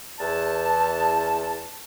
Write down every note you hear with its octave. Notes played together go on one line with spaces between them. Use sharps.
E2 A5